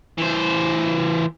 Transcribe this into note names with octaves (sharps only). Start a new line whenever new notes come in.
E3 C5